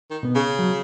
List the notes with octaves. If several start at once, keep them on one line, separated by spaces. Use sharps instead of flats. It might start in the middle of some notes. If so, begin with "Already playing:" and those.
D#3
B2 B3
C#3
F#3